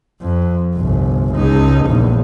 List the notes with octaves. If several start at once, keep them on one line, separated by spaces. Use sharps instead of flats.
F2
G1 C2
C#2 D#4
A#1 E2